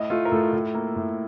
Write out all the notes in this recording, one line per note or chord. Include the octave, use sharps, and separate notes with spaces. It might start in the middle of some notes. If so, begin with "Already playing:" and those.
Already playing: A2 D#5
A3 F4
A#4
A2 A4
A2
A#3
A2